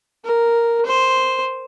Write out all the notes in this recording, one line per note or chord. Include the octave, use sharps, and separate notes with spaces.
A#4
C5